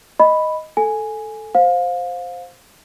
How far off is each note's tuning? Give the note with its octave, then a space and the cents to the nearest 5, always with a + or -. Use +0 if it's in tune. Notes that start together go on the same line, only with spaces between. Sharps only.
D#5 +0 B5 +0
A4 +0 G#5 +0
C5 +0 F5 +25